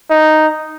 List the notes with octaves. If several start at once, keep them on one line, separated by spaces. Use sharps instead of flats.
D#4